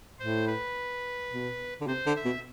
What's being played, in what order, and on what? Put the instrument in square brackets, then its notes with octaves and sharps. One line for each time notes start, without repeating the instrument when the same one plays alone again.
[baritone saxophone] A2 [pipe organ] C5
[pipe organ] B4
[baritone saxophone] B2
D3
[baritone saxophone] C3 [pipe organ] C5
[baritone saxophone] D3
[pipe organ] E5
[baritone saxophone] B2